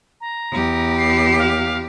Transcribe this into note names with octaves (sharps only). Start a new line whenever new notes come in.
A#5
E2 G4
C7
F5